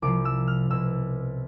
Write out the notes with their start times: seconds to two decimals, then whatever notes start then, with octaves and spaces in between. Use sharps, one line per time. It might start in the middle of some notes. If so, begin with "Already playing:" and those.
0.02 C2 C3 F3 D6
0.25 E6
0.47 F6
0.70 C2 B2 E6